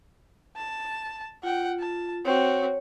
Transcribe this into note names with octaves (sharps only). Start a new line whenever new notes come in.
A5
F4 F#5 G5
A5
C4 F#4 C#5